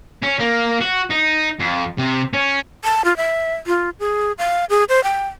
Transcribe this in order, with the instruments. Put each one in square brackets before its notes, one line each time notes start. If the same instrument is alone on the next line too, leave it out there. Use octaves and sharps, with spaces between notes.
[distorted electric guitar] C#4
A#3
F#4
D#4
F2
C3
C#4
[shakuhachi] A5
F4
E5
F4
G#4
F5
G#4
C5
G5